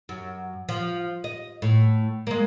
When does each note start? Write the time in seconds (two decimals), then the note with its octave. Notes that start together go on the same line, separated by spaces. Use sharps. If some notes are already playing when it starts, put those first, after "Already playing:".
0.09 F#2
0.69 F3
1.24 D#5
1.62 A2
2.27 G#3 A#3